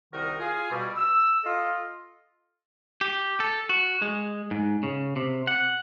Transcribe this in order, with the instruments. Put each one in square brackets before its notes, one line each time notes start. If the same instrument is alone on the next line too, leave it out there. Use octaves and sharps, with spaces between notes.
[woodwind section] C2 D#3 D#4 F#4 A#4
F4 G#4
B2 G3
E6
F4 A4 D#5
[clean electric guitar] G4
A4
F#4
G#3
G#2
C#3
C3
F#5